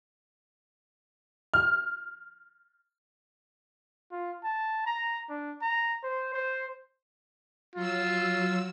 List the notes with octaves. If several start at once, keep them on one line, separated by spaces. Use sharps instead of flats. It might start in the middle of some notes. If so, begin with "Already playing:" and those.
F6
F4
A5
A#5
D4
A#5
C5
C5
F#3 F4 E6